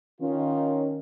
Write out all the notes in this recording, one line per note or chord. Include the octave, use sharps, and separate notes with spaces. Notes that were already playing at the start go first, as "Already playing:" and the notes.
D#3 C#4 D#4 F4